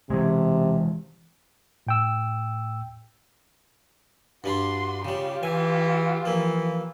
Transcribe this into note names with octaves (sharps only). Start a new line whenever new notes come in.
C3 E3 G#3
A2 G5 E6
G2 G3 D4 F#4 C6
C#3 G3 F4 G4
E3 G#5
E3 F3 A#3